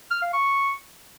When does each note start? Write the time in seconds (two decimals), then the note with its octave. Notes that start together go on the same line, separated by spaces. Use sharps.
0.11 F6
0.22 F5
0.33 C#6